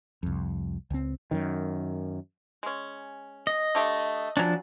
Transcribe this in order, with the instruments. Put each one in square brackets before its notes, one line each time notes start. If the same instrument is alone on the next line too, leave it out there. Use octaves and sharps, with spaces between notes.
[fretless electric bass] C2 F2
C#2 C4
F#2 D#3
[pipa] G#3 C#4
[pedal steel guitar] D#5
[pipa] D3 A3 G4
[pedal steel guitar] F3 D4 [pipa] F#3 C#4